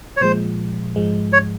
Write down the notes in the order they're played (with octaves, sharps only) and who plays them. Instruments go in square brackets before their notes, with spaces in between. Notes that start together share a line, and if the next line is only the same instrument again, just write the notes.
[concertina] C#5
[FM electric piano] A#2 F3 G#3 [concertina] C5
[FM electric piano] G#2 F3 G#3
[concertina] C#5